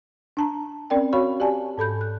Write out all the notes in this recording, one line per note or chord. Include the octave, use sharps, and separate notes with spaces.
D4 A5 A#5
C4 C#4 A#4 D5 G5
F#4 C#5 F5 B5 C#6
G4 D5 F5 G#5 A5
G#2 A4 B5 G6
F#6